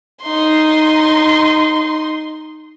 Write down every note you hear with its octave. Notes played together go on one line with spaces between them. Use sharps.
D#4 C6